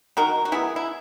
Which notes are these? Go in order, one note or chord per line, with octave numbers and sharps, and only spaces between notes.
D#3 F#4 A#4
F#4
F#3 B3 E4 G#4
E4